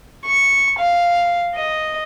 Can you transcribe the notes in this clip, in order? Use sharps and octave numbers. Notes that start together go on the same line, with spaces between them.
C#6
F5
D#5